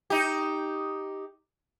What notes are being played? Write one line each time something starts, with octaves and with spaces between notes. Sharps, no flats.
D#4 G4